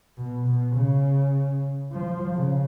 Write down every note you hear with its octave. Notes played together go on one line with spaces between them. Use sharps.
B2
B2
C#3
F3
C#3